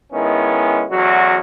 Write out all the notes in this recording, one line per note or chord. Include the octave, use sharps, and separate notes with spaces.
D#3 G#3 B3 C#4 E4
A1 E2 F#3 F#4